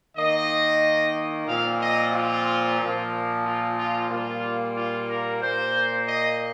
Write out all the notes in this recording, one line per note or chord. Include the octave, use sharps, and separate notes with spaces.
D#3 A#3 D#5
A#2 F3 C4 F5
D#5
F4
A#2 F3 A#3
F4
F4
A#2 G3 A#3 F4
F4
A#4
A#2 A#3 C5
D#5